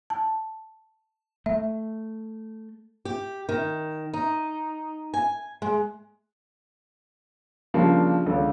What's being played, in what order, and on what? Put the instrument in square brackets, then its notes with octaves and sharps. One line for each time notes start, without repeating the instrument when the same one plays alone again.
[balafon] A5
[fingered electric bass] A3 [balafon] E5
[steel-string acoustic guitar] G4
D#3
D#4
G#5
G#3
[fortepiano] C#3 F3 G3 A#3 D4 G4
C#2 D3